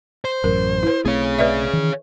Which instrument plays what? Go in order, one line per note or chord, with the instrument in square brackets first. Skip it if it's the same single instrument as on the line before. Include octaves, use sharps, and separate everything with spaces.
[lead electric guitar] C5
[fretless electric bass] A1 F#2 [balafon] A#4
[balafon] E4 B4
[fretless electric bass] B1 A3 C4 [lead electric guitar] G#4 C#5
[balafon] B4 D5 E5
[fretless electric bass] D#3 E3